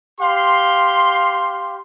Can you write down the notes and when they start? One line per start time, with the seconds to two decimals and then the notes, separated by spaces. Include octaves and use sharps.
0.21 G4 F5 C6